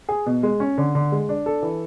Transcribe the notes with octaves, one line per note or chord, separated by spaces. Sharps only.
G#4
B2
G#3
C#4
D3
D3
G#3
D4
A4
E3